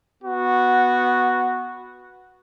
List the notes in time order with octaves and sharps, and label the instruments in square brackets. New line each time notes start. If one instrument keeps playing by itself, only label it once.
[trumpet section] B3 F#4